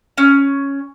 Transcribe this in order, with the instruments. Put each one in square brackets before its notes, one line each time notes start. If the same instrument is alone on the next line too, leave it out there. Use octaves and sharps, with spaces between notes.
[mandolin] C#4